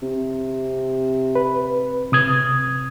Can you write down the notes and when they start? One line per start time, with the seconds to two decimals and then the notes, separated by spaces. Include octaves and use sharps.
0.02 C3
1.35 B4
2.12 C3 D#6 G#6